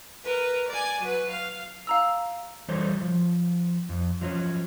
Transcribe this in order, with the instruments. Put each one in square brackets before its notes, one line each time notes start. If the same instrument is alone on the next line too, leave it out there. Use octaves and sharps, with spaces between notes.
[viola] A#4 B4
D5 G#5
F#3 B4
F5
[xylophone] F5 A#5 E6
[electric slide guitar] E3 F#3 G3 A4 C5 C#5
F3
F2
F3 F#3 A3 C#4